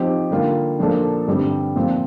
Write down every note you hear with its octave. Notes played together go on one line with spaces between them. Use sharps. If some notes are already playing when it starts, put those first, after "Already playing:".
Already playing: F3 C4 D#4 G4 C5
D3 G3 A#3 F4
A#2 F3 A#3 D4 A4
G2 D3 G3 C4 G4
A#2 F3 C4 F4